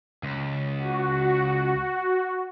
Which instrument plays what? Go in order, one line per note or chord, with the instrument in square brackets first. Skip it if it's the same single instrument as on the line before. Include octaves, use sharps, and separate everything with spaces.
[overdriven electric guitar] C#2
[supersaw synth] F#4